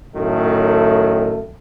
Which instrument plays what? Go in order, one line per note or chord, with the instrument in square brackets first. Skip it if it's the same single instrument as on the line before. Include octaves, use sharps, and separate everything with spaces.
[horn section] F#2 A2 D#3 A3